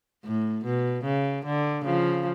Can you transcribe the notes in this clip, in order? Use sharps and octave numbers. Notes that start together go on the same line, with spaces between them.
A2
B2
C#3
D3
C#3 F3